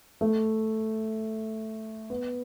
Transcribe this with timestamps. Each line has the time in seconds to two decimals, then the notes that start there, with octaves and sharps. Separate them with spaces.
0.21 A3
2.10 B3